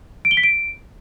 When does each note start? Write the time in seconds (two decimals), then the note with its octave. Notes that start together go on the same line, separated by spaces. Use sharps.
0.25 D7
0.31 G7
0.37 B6
0.43 D7